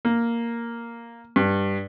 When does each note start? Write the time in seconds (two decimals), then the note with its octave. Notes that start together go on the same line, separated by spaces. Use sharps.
0.05 A#3
1.36 G2